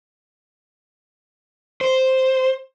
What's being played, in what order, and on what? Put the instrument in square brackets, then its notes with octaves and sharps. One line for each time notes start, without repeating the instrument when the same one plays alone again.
[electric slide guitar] C5